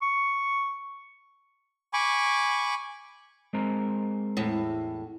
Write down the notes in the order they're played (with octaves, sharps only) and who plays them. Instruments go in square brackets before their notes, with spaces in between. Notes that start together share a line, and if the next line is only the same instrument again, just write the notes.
[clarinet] C#6
[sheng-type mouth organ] G#5 B5 C#6 D6
[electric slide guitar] G#3 C4 A#4
[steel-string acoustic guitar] E2 A2